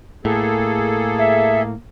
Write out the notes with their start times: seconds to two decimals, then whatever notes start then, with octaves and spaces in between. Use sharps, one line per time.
0.25 A2 A#3 G#4 A4
1.18 E5